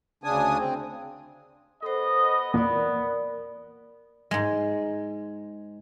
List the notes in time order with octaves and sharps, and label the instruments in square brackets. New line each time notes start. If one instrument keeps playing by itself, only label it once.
[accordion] D2 C#3 D4 G#5 D#6
C4
[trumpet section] B3 D#5 [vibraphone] A4 C5
[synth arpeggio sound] E2 A#2 A#3 [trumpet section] B3 [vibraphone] A#4 D5
[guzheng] G#2 G#3